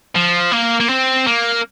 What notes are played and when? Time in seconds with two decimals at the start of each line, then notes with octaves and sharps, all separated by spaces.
0.15 F3
0.52 A#3
0.80 A#3
0.89 C4
1.27 A#3